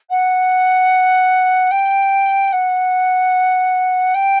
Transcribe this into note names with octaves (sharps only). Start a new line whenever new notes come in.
F#5
G5
F#5
G5